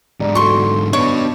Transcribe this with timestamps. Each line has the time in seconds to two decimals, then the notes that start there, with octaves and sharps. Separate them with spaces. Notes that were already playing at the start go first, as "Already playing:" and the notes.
0.20 G#2 D3 D5 A#5
0.35 F#4 A4 C6 C#6
0.93 B2 D4 B4 C#5